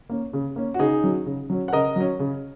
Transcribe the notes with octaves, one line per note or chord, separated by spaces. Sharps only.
A#3 C#4
C#3
A#3 C#4
F#4
C#3 D#4 G#4
F#3 C#4
C#3
F#3 C#4
F#5
C#3 A#4 D#5
F#3 C#4
C#3